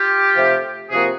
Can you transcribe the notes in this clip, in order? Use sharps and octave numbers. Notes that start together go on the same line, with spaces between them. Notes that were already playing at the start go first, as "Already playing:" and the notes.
Already playing: F4 G4
C3 F3 A3
C3 F3 A#3 F#4 G#4